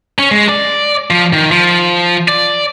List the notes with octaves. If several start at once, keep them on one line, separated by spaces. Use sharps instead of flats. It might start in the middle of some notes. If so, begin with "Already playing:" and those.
C#4
G#3
D5
F3
D#3
F3
D5